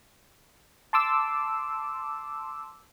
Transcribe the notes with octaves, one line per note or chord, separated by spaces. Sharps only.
A5 C6 D6 E6